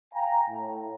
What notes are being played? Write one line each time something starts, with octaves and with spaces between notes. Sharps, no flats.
F5 G5 G#5 A#5
A2